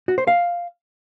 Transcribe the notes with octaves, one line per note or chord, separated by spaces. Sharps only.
F#4
C5
F5